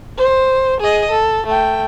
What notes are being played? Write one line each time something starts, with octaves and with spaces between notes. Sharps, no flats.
C5
G#4 D#5
A4
A3 G5